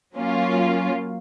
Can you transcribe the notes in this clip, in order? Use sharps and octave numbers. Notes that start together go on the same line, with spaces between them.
F#3 A#3 C#4 F4